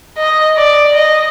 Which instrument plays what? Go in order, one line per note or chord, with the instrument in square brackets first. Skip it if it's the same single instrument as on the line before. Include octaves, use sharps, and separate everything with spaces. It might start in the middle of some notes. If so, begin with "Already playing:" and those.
[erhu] D#5
D5
D#5